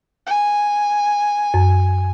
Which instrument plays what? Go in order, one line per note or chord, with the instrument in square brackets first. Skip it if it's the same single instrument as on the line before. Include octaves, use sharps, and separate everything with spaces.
[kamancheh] G#5
[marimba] F#2